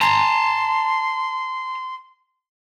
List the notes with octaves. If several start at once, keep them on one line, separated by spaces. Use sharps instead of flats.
A5 A#5 C6